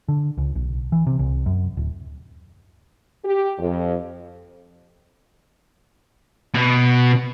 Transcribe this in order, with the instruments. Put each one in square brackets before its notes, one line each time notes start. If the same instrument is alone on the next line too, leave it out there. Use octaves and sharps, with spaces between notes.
[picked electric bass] D3
C#2
B1
E3
C3
C2
F#2
D1
[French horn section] G4
F2
[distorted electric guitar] B2